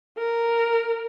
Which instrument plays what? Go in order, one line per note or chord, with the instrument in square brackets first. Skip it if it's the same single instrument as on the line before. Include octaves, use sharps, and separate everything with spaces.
[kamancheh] A#4